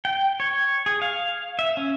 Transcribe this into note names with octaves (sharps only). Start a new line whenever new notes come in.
G5
C#5
G#4
F5
E5
C#4